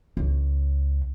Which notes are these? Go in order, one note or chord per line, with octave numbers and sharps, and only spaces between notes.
C#2 C#3